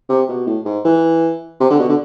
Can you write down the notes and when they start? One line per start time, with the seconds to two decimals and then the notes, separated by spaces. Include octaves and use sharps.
0.09 C3
0.28 B2
0.47 A2
0.65 G#2
0.85 E3
1.60 C3
1.70 D3
1.79 B2
1.89 D3